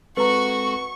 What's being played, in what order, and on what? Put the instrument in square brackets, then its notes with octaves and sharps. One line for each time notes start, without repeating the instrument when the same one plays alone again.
[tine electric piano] G#3 C4 A4 [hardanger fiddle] F#4 [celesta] B4 A#5 [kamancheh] C#6